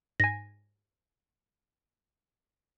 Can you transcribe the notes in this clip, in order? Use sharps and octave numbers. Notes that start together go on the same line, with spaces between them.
G#2 G#5 A#6